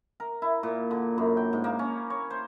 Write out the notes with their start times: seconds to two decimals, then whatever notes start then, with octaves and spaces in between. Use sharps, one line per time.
0.20 A#4
0.42 E4
0.63 A#2
0.91 D3
1.18 F#2
1.37 G5
1.53 G#2
1.64 A#3
1.79 C#4
2.10 C#5
2.30 C5